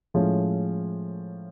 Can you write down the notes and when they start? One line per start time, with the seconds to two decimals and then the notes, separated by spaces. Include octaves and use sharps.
0.14 A2 F3 G#3 C#4